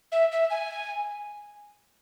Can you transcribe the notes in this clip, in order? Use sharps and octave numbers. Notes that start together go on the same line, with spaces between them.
E5
E5
G#5